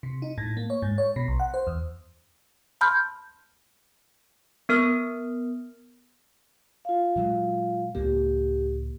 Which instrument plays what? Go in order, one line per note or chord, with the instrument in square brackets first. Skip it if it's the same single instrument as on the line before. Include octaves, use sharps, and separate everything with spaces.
[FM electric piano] C3
D#4
A2
A#3
C#5
G#2
C#5
B2
B1
F#5
C5
E2
[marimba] A5 B5 C6 F6 G6
[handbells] B3 A#4 F6
[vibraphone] F4 F5
[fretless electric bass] A#2 F#3 G#3
[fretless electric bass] C#2 A2 A#3 [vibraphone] G4